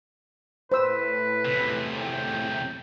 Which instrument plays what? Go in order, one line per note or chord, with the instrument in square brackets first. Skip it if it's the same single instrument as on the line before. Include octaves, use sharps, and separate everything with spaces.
[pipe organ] A2 [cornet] B4 [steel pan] C5 E6
[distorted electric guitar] E2 C3
[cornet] G5